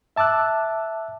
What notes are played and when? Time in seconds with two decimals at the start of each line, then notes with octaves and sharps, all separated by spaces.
0.16 E5 A5 D6 E6 F#6